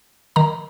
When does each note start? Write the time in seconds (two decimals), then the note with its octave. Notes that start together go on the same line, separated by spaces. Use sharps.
0.36 D#3 A#5